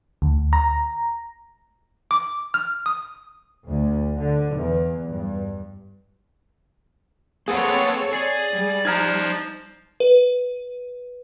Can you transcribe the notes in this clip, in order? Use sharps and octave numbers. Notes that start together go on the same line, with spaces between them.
D2
A#5
D6
F6
D#6
D2
D3
E2
G2
A#3 C4 G#4 A4 B4 C#5 F#5
G#4 D5 C7
G3
F3 D#4 D5 A#5 F6 G#6
B4